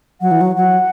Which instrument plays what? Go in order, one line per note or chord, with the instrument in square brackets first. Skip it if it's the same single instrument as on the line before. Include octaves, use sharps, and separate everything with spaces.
[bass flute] F#3 [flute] F#5
[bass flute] E3
F#3
[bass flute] F#3 [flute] F#5